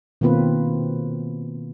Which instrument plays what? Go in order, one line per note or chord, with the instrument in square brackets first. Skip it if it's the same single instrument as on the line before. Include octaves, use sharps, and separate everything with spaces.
[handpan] B2 D#3 A#3 C4 F4 B4